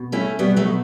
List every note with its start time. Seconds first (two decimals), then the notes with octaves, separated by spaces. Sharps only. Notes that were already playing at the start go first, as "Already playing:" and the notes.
Already playing: B2
0.12 A3 C#4 E4
0.39 B2 G3 B3
0.56 F#3 A3
0.66 B2